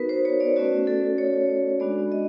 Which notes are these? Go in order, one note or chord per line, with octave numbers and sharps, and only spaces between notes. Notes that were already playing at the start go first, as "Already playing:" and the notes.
Already playing: B3 D#4 F#4 A#4 B4
C5
C#5
D5
A3 C#4 F#4 D5
A4
C#5
C#5
G#3 B3 D4 F#4 D5
D#5